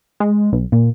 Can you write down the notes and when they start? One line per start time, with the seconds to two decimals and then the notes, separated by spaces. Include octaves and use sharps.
0.20 G#3
0.53 B1
0.72 A#2